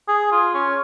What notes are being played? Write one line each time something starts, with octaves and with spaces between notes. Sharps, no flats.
G#4
F4
C#4